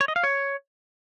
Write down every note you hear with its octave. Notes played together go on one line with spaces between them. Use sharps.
C#5
D#5
F5
C#5